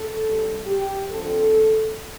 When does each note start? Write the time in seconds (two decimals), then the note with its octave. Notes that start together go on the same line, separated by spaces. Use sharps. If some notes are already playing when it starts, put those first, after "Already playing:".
Already playing: A4
0.23 C3 G3 D4
0.66 G4
1.10 D3 F3 C4 A4